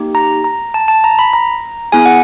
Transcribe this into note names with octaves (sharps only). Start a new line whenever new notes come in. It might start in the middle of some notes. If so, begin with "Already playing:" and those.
Already playing: A#3 D#4 G4
A#5
A#5
A5
A5
A#5
B5
A#5
B3 E4 G#4 G#5
F#5